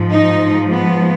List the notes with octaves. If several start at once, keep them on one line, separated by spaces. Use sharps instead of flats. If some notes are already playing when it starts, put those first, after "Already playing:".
Already playing: G#2 F3
D#4
B3